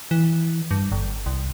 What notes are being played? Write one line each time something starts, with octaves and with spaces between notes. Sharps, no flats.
E3
G2
G1
C2